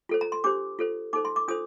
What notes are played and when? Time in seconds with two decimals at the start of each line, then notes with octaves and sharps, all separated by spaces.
0.09 F4 A4 C5
0.21 A#5
0.32 C6
0.44 D4 G4 C5 D6
0.79 F4 A4 C5
1.13 D#4 A4 C5 D6
1.25 C6
1.36 D6
1.48 D4 F4 A4 C5 D#6